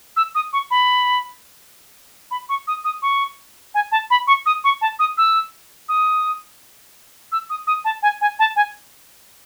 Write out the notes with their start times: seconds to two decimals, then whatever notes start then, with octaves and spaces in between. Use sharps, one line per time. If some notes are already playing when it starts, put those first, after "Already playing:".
0.17 E6
0.35 D#6
0.53 C#6
0.71 B5
2.31 B5
2.49 C#6
2.67 D#6
2.85 D#6
3.02 C#6
3.75 G#5
3.92 A5
4.10 B5
4.27 C#6
4.46 D#6
4.64 C#6
4.81 A5
4.99 D#6
5.18 E6
5.89 D#6
7.32 E6
7.50 D#6
7.67 D#6
7.85 A5
8.03 G#5
8.21 G#5
8.39 A5
8.56 G#5